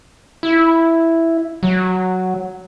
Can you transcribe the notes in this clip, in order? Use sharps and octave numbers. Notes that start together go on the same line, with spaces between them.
E4
F#3